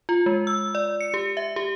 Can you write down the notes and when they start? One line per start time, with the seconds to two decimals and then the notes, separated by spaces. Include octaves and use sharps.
0.09 F4
0.26 G#3
0.47 E6
0.75 D5
1.01 C#7
1.14 G4
1.37 E5
1.56 G4